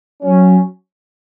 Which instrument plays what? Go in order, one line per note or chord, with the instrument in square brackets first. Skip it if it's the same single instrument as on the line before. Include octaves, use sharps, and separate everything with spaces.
[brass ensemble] F#3 C#4